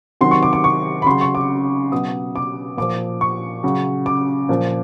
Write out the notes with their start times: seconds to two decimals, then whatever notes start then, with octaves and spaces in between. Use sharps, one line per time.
0.21 C3 D#3 F#3 C6
0.31 C#6
0.43 D6
0.53 D6
0.64 C#6
1.02 B5
1.06 C#3 F#3 C6
1.21 C#6
1.35 D6
1.92 B2 F#3 D#6
2.36 D6
2.77 A#2 F3 D6
3.21 C#6
3.63 C#3 F#3
4.06 D6
4.49 A#2 F3